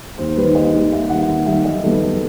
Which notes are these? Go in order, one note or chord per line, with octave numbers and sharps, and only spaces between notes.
D#2 C5
D#3 G3 B4
D#2 D#5
D#3 G3
D#2 E5
D#3 G3 F#5
D#2
D#3 G3 E5
F#2 D#5
D#3 G3 B3 A4
F#2